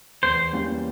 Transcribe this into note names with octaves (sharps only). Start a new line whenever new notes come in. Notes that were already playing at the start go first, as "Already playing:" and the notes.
E2 C5
E3 G3 A#3 C#4